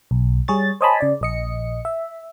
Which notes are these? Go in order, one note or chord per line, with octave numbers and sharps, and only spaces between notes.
B1
G3 G#4 C#5 A6
C5 C#5 D#5 G#5 A5 B5
C#3 D5
A#1 D#5 C#7
E5